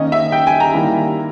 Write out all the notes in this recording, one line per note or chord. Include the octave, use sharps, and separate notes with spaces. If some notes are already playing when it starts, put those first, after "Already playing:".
Already playing: D#3 A#3 C#4 D#5
E5
G5
G#5
A#5
D#3 G3 A#3 E4